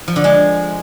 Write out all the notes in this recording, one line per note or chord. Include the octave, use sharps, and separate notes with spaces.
F3
D3
G#3